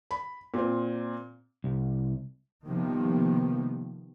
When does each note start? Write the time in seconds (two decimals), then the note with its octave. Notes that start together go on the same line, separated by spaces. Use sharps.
0.11 B5
0.54 A#2 C4
1.64 C2
2.64 C3 D#3 F3 G3 A#3 B3